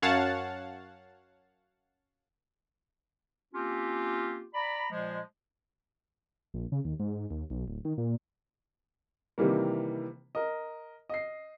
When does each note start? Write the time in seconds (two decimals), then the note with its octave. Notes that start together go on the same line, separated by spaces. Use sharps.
0.02 F#2 C#5 F5 F#5 A5 A6
3.54 A#3 C4 C#4 F4 G4
4.54 D5 A#5 B5
4.91 A#2 F3 G#3
6.54 A#1
6.72 C#3
6.85 D#2
7.00 G#2
7.30 D#2
7.50 B1
7.68 D1
7.85 D#3
7.98 A#2
9.38 C3 D#3 E3 G3 A#3
10.35 A#4 D#5
11.10 D#5 C7